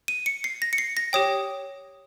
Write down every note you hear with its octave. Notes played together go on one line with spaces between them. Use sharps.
D#7
C#7
C7
A#6
C#7
C7
A#6
G4 C#5 G5 D#6